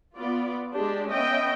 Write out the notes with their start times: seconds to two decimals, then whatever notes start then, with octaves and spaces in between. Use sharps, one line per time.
0.16 B3 F4 D5
0.74 G#3 D4 G4
1.11 B3 C#4 D#5 E5 G5